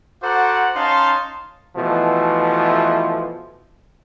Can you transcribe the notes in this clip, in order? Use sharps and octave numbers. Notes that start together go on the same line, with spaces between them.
F#4 A4 C5 F#5 A#5 D6
C#4 D#4 F5 A5 C6
B2 E3 F3 A3